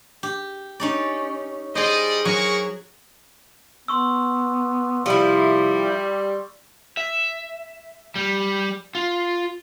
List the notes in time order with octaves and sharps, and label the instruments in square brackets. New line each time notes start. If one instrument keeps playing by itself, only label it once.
[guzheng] G4
C#4 D#4 D5
[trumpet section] G3 D5 D#5 [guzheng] G#4 C5
[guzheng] F#3 [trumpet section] G#4 A#4 C#6
[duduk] B3 [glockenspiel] C6 C#6 E6
[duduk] C3 [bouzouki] F3 E4 [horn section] G3
[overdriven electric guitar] E5
G3
F4